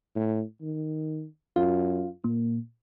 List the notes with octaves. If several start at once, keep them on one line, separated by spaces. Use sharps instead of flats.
A2
D#3
F#2 F4
A#2 A#3